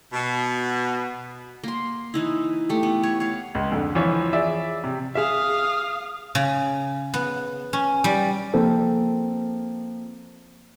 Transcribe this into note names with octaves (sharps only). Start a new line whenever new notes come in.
B2
A#3 C6
E3 D#4 E4
A3 G4
B3
C#5
C#5 F5
C#2
F2 D3
E3 F3 C#5
G#4 D5 E5
C3
G#4 E5 F5 D#6
C#3
B3
C#4
G3
F3 A#3 C4 A4